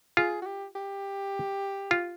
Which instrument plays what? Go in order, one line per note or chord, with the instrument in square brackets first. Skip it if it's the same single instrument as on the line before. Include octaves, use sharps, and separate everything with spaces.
[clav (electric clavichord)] F4 [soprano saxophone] G#4
[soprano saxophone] F#4
G4
G4
[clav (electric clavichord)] F4